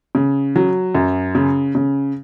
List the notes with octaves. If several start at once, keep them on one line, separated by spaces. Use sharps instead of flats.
C#3
F#3
F#2
C#3
C#3